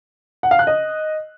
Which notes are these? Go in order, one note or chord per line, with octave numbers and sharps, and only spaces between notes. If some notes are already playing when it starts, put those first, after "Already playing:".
F#5
F5
F#6
D#5